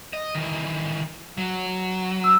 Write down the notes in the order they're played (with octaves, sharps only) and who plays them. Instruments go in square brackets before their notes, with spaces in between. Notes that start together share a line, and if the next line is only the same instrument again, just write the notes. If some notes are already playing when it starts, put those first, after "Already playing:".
[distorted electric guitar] D#5
D#3 E3
F#3
[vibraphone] E6